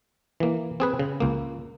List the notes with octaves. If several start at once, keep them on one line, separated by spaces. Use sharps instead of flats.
E3 A#3
C4 G#4 B4
C#3
C#2 A#3